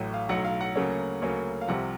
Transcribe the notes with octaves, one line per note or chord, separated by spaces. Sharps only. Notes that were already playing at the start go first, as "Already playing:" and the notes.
Already playing: A1 A2 F#3
F5
B1 A2 F#3 F#5
F5
F#5
D2 C#3 F#3 A#3 C#4
D2 C#3 F#3 A#3 C#4
F5
C2 C3 F3 F#5